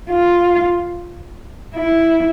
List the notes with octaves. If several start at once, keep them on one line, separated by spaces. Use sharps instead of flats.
F4
E4